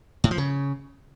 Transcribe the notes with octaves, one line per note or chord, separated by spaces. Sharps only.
A2
F3
C#3